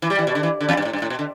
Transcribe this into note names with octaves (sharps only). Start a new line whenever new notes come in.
E3
G3
E3
B2
D3
E3
D3
E2
G2
A2
G2
A2
B2
D3